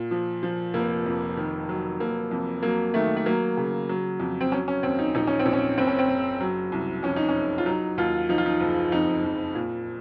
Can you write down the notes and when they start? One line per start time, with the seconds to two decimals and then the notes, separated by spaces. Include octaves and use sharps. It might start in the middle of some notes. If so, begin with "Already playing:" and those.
Already playing: A#2
0.11 F3
0.43 F3
0.74 F1 A#3
1.06 F2
1.37 D#3
1.69 F#3
2.00 F1 A#3
2.31 F2
2.63 F#3 A#3
2.94 D#3 A3
3.17 A3
3.26 F#3 A#3
3.57 C#3
3.89 F#3
4.20 F2
4.41 C4
4.52 F#3 C#4
4.68 C#4
4.83 D#2 C4
4.99 D#4
5.15 A#1 D#4
5.27 C#4
5.39 C4
5.46 A#1
5.53 C#4
5.78 F#1 C4
5.87 C#4
5.99 C4
6.08 F#1
6.41 F#3
6.72 C2
7.03 F2 C#4
7.16 D#4
7.29 C#4
7.34 F#1
7.58 F4
7.66 F#3 D#4
7.97 D#2 F4
8.29 F3 D#4
8.38 F4
8.46 D#4
8.60 F#1
8.92 F2 D#4
9.24 F2
9.55 A#2